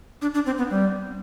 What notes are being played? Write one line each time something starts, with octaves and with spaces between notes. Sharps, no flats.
D4
D4
C4
B3
G3